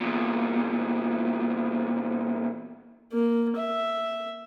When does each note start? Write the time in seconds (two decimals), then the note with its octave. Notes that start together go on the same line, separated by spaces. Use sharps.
0.01 E2 A#2
3.13 A#3
3.57 E5